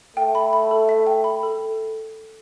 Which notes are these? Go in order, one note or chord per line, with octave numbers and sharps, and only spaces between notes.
A3 G5
B5
B5
A4
E5
G5
B5
A4